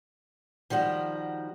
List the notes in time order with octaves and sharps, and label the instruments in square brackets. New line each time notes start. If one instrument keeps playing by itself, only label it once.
[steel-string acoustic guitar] D#3 F3 G3 F#4